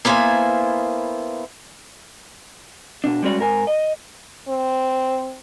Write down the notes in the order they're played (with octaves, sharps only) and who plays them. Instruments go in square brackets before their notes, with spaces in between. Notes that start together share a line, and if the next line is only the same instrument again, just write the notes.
[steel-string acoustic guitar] A#3 B3 E4 C5 F5 G#5
[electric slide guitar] B2 D4
G3 G#3 C#4 F#4 D5
G#2 A#4 G#5
D#5
[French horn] C4